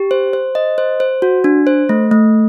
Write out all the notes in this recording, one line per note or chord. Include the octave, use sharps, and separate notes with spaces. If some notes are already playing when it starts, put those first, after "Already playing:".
Already playing: G4
C5
C5
D#5
C5
C5
F#4
D4
C5
A3
A3